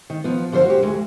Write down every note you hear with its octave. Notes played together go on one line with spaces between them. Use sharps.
D#3
F3 B3
F#2 D3 F3 C5
F#4 G4
D2 G#3